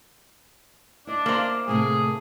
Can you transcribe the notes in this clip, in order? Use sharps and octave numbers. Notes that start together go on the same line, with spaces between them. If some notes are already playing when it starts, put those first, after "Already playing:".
D4 E4 D#5 D6
A#3 C5
A2 C3 A3 G#4